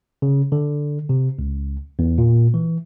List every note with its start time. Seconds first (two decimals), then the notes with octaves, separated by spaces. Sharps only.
0.22 C#3
0.52 D3
1.09 C3
1.39 C#2
1.99 E2
2.18 A#2
2.54 E3